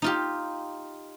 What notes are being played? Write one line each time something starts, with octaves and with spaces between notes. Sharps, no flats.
D#4 F4 G4